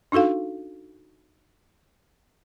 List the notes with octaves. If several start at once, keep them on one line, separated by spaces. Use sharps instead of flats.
D4 D#4 F#4 A4 F5